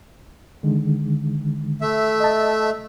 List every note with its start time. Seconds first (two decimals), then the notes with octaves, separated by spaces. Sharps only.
0.63 D3 D#3 G#3
1.81 A3 E5
2.20 D#5 A5